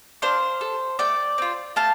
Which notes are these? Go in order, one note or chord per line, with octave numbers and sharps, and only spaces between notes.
D4 C5 F5
A4
A3 D5 G5
C4 F4
A3 F5 A5